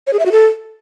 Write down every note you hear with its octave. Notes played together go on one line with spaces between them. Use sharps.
C#5
G#4
E5
F#4
A4